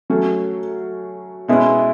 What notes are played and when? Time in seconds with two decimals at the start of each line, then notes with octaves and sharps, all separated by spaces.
0.10 F#3 A3 C#4
1.48 B2 G#3 C#4 E4 B4